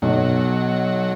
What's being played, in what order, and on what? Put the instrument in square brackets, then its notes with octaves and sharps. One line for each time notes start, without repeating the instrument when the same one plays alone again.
[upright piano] B1 [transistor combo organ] F#3